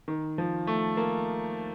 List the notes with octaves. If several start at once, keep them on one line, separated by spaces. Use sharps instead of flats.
D#3
F3
A3
A#3